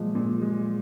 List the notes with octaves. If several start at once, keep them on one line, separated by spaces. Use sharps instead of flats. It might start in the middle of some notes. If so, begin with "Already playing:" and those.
Already playing: A#2 F3 F#3 G#3
A#2
G#3